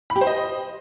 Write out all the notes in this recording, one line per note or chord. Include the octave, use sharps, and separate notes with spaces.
B5
G4
C5
D#5